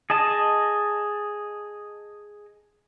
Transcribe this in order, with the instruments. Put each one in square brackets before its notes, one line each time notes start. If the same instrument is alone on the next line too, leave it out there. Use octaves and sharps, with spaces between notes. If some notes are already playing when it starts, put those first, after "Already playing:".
[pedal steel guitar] G#4 D#5 A5